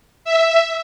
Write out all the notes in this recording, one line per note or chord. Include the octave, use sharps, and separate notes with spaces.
E5